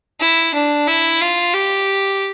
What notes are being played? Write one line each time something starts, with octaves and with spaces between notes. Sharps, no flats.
E4
D4
E4
F4
G4